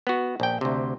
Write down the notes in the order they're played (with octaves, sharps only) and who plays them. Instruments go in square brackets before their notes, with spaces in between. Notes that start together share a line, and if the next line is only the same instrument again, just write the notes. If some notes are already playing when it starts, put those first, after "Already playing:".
[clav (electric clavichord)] B3 F#4
A#1 G5
D2 C3